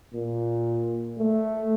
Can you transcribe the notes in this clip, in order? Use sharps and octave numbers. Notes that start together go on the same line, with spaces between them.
A#2
A3